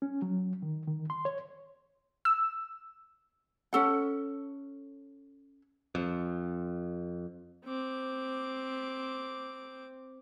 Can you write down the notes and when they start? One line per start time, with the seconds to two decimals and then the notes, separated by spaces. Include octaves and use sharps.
0.02 C#4
0.22 F#3
0.62 D#3
0.87 D#3
1.10 C6
1.25 C#5
2.25 E6
3.73 C#4 A4 F#5
5.95 F2
7.65 C4 D6